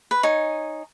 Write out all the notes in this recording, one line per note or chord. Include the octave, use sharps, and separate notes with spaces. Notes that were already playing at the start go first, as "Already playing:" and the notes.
B4
D#4 C#5 G#5